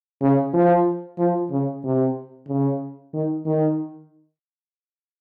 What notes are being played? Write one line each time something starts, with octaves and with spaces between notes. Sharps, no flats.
C#3
F3
F3
C#3
C3
C#3
D#3
D#3